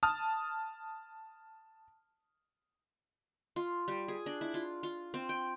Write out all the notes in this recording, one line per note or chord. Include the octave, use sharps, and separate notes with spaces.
A5 D#6 F6
F4
G3
G#4
D4
E4
F4
F4
C4
G5